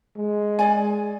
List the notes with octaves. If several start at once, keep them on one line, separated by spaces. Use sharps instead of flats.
G#3
G#4 D5 G#5